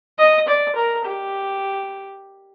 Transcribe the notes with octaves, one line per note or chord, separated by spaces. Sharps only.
D#5
D5
A#4
G4